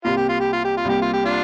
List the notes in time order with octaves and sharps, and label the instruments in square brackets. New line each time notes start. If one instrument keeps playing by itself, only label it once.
[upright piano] C2 C3 G3 A#3 [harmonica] F4
[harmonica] G4
F4
G4
F4
G4
F4
[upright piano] C2 C3 G3 A#3 [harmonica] G4
[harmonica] F4
G4
D4 F4